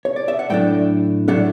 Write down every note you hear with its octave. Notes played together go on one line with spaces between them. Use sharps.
C#5
D5
E5
F#5
A2 F#3 A3 D4 G5
A2 F#3 A3 D4 F#5